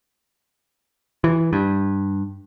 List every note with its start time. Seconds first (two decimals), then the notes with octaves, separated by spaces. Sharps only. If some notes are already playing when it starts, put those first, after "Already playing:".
1.24 E3
1.53 G2